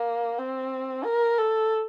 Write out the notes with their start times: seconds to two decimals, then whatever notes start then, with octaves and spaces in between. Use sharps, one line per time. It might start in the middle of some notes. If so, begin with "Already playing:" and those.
Already playing: A#3
0.38 C4
1.05 A#4
1.38 A4